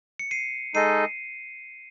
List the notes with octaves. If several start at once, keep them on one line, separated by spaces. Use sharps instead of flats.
C#7
C7 D#7
G#3 D#4 A4 D#5 C7 D#7